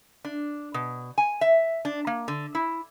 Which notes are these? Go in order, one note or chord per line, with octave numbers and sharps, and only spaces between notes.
D4
B2
G#5
E5
D4
A#3
D3
E4